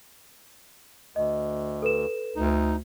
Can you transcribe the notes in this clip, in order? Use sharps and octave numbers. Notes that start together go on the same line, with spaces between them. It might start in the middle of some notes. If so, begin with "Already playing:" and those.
D2 D#5
A4 B4 E7
D2 D#4